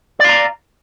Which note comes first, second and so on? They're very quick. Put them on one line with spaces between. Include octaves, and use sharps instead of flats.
D5 F5 A#5